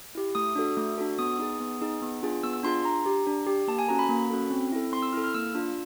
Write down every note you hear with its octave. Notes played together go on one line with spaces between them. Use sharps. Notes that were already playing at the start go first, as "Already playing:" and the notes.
E4 G4
A3 D#6
D4 F#4 A4
A3
D4 F#4 A4
B3 D#6
D#4 G#4
B3
D#4 G#4
B3
D4 F4 G#4
B3 E6
E6
D4 F4 G#4 C6
C6
D4 A#5
G4
D4
G4
A#3 A5
G#5
C#4 F#4 A4 A#5
B5
A#3
C#4 F#4 A4
C4
E4 A4
C4 C6
E6
E4 A4 F6
F6
A#3 E6
D4 F4